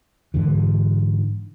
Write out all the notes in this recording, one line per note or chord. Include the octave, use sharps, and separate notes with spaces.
G#2 D3 E3